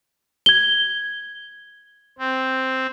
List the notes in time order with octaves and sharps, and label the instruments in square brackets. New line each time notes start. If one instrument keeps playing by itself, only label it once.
[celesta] G#6 G7
[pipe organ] C4